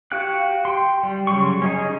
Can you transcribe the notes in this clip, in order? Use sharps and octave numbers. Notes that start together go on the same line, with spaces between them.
F#4 G4 F5 G5 F#6
G5 C6
G3
C#3 F#3 G3 C6 C#6
C#4 D#4 G#4